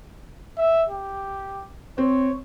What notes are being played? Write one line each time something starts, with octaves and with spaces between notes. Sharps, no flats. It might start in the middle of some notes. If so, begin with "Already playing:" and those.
E5
G4
C4 C#5